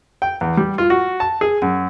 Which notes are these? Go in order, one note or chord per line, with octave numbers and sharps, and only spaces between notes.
G5
E2
G3
F4
F#4
A5
G#4
F#2